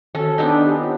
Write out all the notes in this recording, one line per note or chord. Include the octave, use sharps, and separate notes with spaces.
D#3 C#4 F#4 A4
B3 C4 D4 D#4
G#5
G4
F4 C#5 F#5